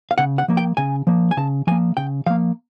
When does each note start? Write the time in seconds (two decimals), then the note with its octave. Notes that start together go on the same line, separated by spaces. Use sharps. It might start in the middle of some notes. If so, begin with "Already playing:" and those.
0.11 F5
0.18 C#3 F#5
0.38 F#5
0.48 F3 A#3
0.57 G5
0.77 C#3 G#5
1.07 F3 A#3
1.31 G#5
1.37 C#3 A5
1.67 F3 A#3 G#5
1.97 C#3 G5
2.26 F3 A#3 F5